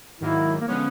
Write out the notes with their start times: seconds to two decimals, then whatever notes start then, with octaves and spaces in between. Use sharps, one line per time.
0.21 G#2 D#3 F#3 A#3 E4
0.61 A#3
0.67 D3 F3 G#3 B3 C#4